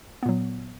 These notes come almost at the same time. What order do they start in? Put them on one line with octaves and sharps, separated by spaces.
B3 A#2 F#3